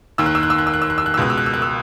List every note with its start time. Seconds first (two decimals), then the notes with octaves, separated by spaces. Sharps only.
0.18 D#2 D#3 E6
0.26 F#6
0.35 E6
0.43 F#6
0.50 E6
0.58 F#6
0.67 E6
0.74 F#6
0.82 E6
0.90 F#6
0.98 E6
1.06 F#6
1.14 E6
1.17 C#2 B2 F#6
1.30 E6
1.38 F#6
1.46 E6
1.54 F#6
1.62 E6